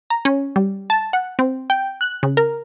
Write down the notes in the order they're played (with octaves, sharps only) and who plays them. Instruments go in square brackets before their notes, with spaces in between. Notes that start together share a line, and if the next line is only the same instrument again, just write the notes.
[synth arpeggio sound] A#5
C#4
G3
A5
F#5
C4
G5
F#6
C#3
A#4